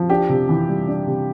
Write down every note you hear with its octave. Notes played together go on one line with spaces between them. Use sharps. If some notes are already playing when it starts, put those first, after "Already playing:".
Already playing: F3
D4 G4
C3
E3
G3
D4
C3